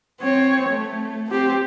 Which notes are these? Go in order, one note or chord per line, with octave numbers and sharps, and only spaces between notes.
C4 C#5
A3
C4 G4